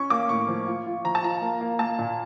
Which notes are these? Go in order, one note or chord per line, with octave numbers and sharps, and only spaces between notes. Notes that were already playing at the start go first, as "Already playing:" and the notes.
Already playing: C#4 C#6
A#3 D6
A2 C#6
F3
F4
F4
F3 A#5
A5
F4 A#5
A#3
A#3
A#3 A5
A#2